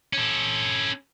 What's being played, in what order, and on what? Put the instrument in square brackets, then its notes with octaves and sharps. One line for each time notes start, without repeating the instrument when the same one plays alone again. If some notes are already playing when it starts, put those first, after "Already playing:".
[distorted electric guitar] C#4 A4